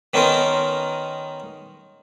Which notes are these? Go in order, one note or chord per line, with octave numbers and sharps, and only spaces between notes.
D#3 B3 C#4 D#4 F4 A#4